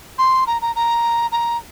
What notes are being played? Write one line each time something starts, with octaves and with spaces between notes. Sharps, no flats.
C6
A#5
A#5
A#5
A#5